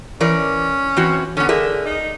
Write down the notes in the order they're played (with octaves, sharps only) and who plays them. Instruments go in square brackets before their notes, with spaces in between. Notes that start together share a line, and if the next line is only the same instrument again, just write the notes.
[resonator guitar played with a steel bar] E3 A#4 D5 [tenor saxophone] C#4
[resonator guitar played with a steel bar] E3 C4 F#4
[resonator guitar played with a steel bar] D3 B3 [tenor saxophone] C#4
[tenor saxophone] D3 [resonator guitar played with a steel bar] G#4 A#4 E5
[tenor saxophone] D#4